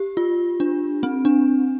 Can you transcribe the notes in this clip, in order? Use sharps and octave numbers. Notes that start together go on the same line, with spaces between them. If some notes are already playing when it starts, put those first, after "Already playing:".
Already playing: G4
F4
D4
C4
D4